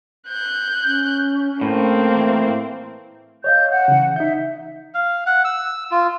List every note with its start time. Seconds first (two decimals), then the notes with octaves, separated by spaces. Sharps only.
0.28 F#6 G6
0.86 C#4
1.61 A2 A#3 C4
2.14 E3
3.44 C#5 D#5 F5 G6
3.71 F#5
3.88 C#3 E3
4.16 D#4 E5 G6
4.94 F5
5.26 F#5
5.45 E6
5.91 F4